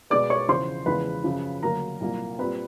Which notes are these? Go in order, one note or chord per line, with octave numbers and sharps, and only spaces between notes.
B2 G#3 B3 D5 D6
C#5 C#6
E2 C#3 F3 C5 C6
E2 C#3 F3 G#3 B4 B5
F#2 C#3 F3
D2 C#3 F#3 A#3 A#4 A#5
C2 A#2 F#3 A#3
A#2 G3 C4 B4 B5